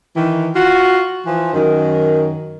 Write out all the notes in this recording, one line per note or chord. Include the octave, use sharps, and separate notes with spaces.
D#3 E3
F4 F#4
E3 F3
F#2 D#3